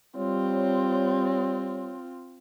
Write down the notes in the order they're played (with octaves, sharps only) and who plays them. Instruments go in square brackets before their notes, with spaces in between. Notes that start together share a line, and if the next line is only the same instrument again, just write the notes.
[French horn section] G3 C#5 [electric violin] C4 F4